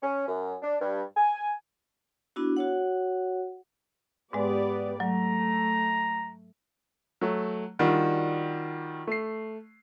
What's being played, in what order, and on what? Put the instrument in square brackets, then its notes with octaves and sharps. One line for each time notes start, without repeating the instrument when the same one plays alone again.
[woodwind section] C#4
F#2
D4
G2
G#5
[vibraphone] B3 D4 E4 F#4
F#4 C#5 F#5
[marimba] G#2 G#3 [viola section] B3 G4 D5
[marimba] F#3 [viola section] A3 [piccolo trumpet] A#5
[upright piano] F#3 A3
D#3 G3 D4 F4 F#4
A3 C7